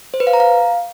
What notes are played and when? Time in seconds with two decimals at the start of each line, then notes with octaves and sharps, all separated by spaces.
0.14 C5
0.20 B4
0.27 F5
0.33 A#5
0.40 F5